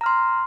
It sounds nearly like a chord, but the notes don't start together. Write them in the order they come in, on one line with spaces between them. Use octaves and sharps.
A#5 F6 C6